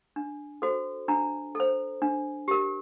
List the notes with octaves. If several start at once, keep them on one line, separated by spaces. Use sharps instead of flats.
D4
F#4 A4 C5
D4 A#5
A4 C5
D4
G4 A#4